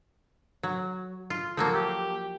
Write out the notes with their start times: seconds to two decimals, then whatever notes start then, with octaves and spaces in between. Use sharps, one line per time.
0.63 F#3
1.30 F4
1.57 F3 F#3 A#3 A4
1.74 G4